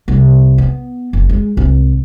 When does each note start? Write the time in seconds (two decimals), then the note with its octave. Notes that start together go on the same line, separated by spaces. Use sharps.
0.08 C2
0.58 B3
1.13 F#1
1.29 G#3
1.57 C2 G#2